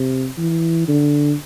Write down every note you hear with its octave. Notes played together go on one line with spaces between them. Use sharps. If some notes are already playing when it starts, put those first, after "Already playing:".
Already playing: C3
E3
D3